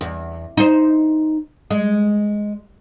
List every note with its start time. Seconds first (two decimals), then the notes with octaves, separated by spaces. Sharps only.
0.01 E2
0.57 D#4 C5
1.71 G#3